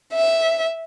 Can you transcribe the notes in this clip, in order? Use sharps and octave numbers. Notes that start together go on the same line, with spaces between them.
E5